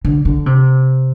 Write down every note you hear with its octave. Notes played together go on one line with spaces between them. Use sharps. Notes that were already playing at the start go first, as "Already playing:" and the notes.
D3
D3
C3